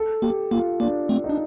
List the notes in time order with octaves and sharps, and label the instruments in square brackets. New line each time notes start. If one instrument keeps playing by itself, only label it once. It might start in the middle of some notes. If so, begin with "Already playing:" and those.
Already playing: [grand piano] A4
[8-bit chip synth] A#3 [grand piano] G4
[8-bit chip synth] A#3 [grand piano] F4
[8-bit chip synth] A#3 [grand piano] D4
[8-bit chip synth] A3 C4
[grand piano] D#4
[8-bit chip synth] D4